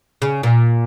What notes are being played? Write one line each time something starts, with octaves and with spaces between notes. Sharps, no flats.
C#3
A#2